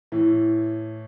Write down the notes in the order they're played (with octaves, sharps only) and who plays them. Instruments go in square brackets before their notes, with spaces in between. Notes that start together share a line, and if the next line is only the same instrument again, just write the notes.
[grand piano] A2 E3